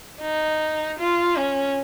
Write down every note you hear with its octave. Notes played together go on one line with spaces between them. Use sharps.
D#4
F4
C#4